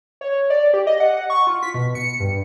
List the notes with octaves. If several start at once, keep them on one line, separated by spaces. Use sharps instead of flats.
C#5
D5
G4
D#5
F#5
F#5
C#6
F4
B6
B2
C#7
G2